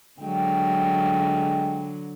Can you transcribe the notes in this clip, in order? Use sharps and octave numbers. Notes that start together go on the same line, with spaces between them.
D3 F#3 G#3 G5